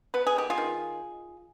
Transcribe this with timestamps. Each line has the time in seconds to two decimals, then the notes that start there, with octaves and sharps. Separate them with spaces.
0.14 B3 B4
0.27 G#4
0.36 D#3 G4
0.50 F4 G#4
0.58 D#3